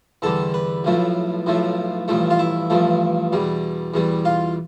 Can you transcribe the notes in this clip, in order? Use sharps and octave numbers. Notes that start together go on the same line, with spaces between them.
E2 D3 G3 A4
B4
B1 A2 F3 A3
B1 A2 F3 A3
A1 G2 F3 A3
F4
E4
A1 G2 F3 A3
E2 B2 G3
E2 B2 G3
F4